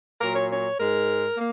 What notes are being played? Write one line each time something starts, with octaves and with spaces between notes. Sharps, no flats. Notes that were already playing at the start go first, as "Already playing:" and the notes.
A#2 F#3 A#4
C#5
C#5
G#2 G#3 A#4
A#3